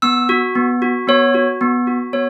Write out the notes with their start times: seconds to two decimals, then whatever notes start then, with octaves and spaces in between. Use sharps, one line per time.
0.02 B3 E6
0.29 F#4
0.55 B3
0.82 F#4
1.08 B3 C#5
1.34 F#4
1.61 B3
1.87 F#4
2.13 B3 C#5